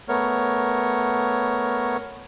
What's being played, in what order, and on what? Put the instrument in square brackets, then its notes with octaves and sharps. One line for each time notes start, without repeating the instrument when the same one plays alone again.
[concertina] A3 B3 A#4 C#5